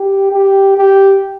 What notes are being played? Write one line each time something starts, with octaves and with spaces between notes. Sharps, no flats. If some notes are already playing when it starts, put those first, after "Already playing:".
Already playing: G4
G4
G4